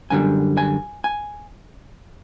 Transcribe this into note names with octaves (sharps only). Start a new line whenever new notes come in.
F#2 D3 G3 G#5
G#5
G#5